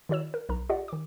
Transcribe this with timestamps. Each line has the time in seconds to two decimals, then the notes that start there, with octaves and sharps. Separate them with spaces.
0.09 D#3 E4 F#4 C#5 E6 E7
0.34 A#4
0.49 B1 A#4 A#5
0.69 F4 G4 D5 D#5 F#5
0.88 D#3 D6